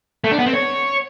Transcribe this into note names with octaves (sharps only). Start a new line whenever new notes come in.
A3
D4
B3
C4
C#5